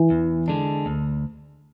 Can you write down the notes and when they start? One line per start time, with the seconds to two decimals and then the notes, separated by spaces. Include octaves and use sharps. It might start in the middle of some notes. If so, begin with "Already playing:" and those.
Already playing: E3
0.10 E2
0.48 D3 G#3 D4
0.86 D2